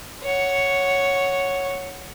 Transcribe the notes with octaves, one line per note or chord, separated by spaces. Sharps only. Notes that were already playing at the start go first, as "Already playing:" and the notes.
C#5 F#5